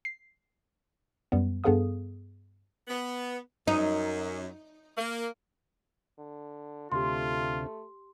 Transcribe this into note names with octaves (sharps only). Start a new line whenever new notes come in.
C7
F#2 G3 B3
G2 B3 G#4 A4 F5 D#6
B3
F#2 D#4
A#3
D3
D2 C3 A3 F4 G4 C6